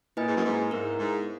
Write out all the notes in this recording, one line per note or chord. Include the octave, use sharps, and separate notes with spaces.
A#2 A#3 E4 B4 D#5 G#5
G#2
F#2
G#2
G#2 B3 E4 A#4
G#2